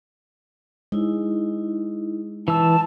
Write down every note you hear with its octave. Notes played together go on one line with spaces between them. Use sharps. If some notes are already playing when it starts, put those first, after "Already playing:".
G#3 D#4 E4
E3 A5 E6